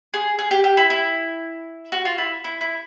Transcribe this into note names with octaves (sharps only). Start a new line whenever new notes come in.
G#4
G#4
G4
G4
E4
E4
F#4
F4
E4
E4
E4